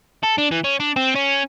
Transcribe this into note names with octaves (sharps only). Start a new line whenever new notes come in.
A4
D4
E3
C#4
D4
C4
C#4